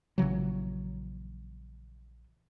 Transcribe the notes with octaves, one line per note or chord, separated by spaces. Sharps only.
A#1 C#3 E3 F#3